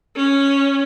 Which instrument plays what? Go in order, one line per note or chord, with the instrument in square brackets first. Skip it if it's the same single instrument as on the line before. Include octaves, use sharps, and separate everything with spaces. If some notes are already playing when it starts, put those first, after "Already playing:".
[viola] C#4